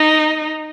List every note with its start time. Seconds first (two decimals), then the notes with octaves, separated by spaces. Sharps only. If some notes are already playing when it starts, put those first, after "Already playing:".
Already playing: D#4